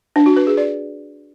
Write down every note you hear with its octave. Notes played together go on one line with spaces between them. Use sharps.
D4
F#4
B4
G#4
D5